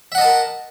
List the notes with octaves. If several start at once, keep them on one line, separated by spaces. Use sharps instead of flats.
A#4 D#5 E5 F#5 A5